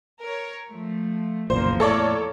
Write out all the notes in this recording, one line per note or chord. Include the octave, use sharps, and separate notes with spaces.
A#4 C#5
F3 A3
F#1 B1 E2 A#2 F3 A#3 C5
A2 A4 C#5 D5